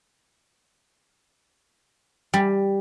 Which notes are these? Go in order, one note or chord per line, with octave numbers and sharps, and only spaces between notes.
G3